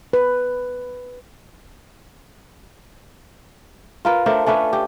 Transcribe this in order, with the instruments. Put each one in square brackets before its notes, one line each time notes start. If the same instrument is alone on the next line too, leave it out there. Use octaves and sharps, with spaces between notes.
[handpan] B4
[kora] F4 A#4 B4
A3 D4 A#4 C5
A3 C#4 D4 B4
G4